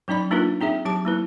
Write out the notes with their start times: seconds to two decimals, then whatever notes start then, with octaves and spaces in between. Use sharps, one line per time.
0.08 F#3 C#4 D#4 D5 B5
0.31 A#3 D4 D#4 F4 A#4 B4
0.61 C4 D#4 G#4 E5
0.85 F#3 G4 A5 D6
1.05 A#3 E4 B4